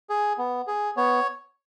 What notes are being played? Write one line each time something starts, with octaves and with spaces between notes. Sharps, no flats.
G#4
B3
G#4
B3 C#5